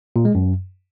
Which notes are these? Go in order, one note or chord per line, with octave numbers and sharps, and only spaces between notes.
A#2
G#3
F#2